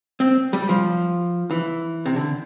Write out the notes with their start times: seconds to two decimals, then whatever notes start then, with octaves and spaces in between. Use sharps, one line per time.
0.20 C4
0.53 G3
0.69 F3
1.51 E3
2.06 C3
2.16 D3